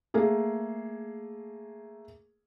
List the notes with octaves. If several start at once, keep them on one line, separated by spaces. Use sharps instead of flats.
A3 A#3 G#4 A#4